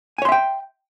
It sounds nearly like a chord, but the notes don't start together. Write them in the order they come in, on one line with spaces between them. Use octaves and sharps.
G#5 C#5 C6 E5 G5